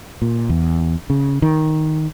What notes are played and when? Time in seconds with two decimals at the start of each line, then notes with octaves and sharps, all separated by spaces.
0.22 A#2
0.49 E2
1.10 C#3
1.42 D#3